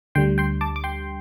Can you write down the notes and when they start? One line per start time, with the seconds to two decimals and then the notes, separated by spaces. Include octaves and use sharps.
0.15 D2 D3 G3 G5 C6
0.38 G5 C6
0.61 A5 D6
0.76 D6
0.84 G5 C6